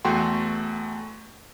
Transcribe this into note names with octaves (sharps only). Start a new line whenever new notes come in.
E2 A3 F#4 G5 C6